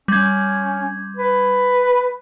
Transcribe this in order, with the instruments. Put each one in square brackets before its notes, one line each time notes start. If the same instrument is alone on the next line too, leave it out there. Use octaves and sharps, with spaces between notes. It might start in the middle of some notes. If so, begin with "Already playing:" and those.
[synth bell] G3 G#6 [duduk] C#4
[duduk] B4